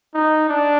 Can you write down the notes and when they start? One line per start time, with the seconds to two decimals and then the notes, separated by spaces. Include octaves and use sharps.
0.14 D#4
0.49 D4